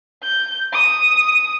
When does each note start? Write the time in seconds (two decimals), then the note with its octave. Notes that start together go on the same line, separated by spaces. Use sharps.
0.23 G6
0.73 D#6